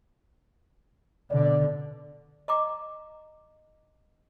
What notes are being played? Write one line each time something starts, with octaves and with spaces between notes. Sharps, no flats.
B2 D3 D5
D#5 A#5 D6